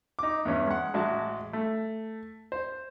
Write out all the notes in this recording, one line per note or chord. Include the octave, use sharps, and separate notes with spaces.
D#4 D6
E2 G2 C#4
G#3 F#5
A1 G#3 F#4 A5
A3
C5